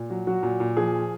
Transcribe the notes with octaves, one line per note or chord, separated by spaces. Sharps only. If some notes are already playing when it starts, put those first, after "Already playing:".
Already playing: A#2
F#3
F#3 F#4
A#2
A#2
F3 G#4